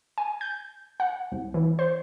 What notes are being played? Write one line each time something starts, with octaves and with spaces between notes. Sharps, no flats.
G#5
G6
F#5
C2
E3
C5